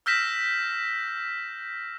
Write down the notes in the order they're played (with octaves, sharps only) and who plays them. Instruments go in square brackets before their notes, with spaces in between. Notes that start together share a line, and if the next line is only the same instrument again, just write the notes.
[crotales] E6 F6 G6 A#6 B6 E7